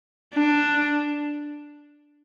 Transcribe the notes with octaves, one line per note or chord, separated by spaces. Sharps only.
D4